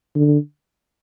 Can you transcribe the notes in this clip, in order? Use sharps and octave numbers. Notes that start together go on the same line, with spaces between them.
D3